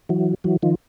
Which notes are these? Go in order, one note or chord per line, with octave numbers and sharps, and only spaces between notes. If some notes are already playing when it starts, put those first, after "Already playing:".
E3 F#3
E3 F#3
D#3 F3